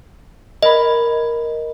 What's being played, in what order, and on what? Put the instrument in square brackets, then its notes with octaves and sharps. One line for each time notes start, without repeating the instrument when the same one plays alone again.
[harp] A#4 B5 [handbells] D#5